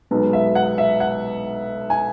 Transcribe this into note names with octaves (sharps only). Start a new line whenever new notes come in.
B1 B2 G#3 B3
E5
F#5
E5
F#5
G#5